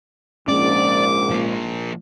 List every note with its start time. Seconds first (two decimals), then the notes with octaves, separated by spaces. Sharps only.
0.48 A#1 G#2 G#3 C#4 D5 D6
1.31 F3 A#3